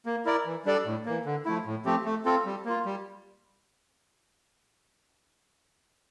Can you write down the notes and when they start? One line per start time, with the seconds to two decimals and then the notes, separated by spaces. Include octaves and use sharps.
0.06 A#3
0.25 E4 A#4 D5
0.46 E3
0.65 G3 D4 A4 D5
0.85 A2
1.06 E3 A#3
1.26 D3
1.45 F3 A3 E4
1.65 A2
1.85 F3 A3 C4 G4
2.05 A3
2.25 C4 F4 A4
2.45 G3
2.65 A#3 F4
2.86 G3